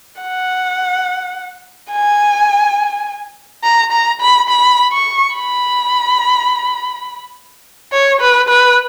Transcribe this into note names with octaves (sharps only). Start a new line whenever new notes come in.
F#5
G#5
A#5
A#5
B5
B5
C#6
B5
C#5
B4
B4